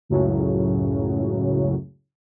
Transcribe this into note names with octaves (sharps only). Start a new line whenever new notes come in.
C#2 F#2 A2 C#3 F#3